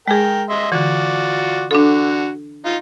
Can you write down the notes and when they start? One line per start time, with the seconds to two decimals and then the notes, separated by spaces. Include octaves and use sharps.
0.08 G#3 G#4 A#4 G5
0.50 D#5 E5 C6
0.72 D3 E3 F4 F#4 D5
1.71 D3 D4 F#4 A4
2.65 D#4 F4